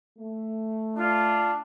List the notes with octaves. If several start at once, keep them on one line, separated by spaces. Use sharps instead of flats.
A3
D4 F4